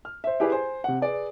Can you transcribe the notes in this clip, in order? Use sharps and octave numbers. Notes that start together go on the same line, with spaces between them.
F6
C5 E5
E4 G4 G#4 B4 D5 E5
C5 G#5
C3 F#5
G#4 B4 D5